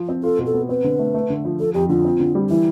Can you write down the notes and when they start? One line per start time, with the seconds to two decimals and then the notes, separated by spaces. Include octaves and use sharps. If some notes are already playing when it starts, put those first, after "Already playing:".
Already playing: F3 F4
0.09 C4
0.23 F4 A4
0.39 B2
0.46 A4
0.54 B3
0.69 C4 B4
0.84 D3
0.99 A3
1.14 A3
1.30 D3
1.45 F3
1.60 F3 A4
1.74 F2 G4
1.89 D3 F4
2.05 C4
2.20 D3
2.35 G3
2.50 E3 E4